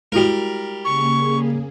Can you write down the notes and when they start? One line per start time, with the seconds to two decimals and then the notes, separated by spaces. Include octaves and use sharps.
0.12 G3 G#3 E4 F#4 A#4
0.85 C#3 A#3 G#4 C#6